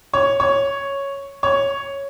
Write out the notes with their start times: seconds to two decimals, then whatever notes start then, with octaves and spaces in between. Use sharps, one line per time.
0.14 C#5
0.40 C#5
1.43 C#5